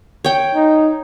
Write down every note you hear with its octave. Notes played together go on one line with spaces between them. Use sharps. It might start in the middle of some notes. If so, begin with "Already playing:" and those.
C#5 G5
D#4